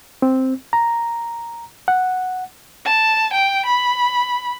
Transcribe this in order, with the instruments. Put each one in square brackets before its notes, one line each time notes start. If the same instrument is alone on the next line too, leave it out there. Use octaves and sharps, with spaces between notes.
[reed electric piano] C4
A#5
F#5
[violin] A5
G5
B5